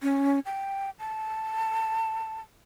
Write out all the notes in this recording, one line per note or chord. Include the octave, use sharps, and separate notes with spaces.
C#4
G5
A5